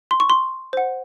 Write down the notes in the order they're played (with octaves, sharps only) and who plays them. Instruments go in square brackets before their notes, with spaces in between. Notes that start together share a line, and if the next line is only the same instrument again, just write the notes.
[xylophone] C6
C#6
C6
C5 F#5